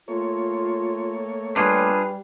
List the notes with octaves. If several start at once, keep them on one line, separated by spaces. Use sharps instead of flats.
A3 A#3 F4 C#5
G3 D4 F4 G#4 B4